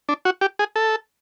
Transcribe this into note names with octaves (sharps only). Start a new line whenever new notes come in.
D4
F#4
G4
G#4
A4